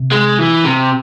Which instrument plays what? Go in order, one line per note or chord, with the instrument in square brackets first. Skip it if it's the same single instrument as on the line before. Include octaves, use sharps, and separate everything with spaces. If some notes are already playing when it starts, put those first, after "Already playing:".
Already playing: [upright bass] C3
[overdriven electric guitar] G#3
E3
C3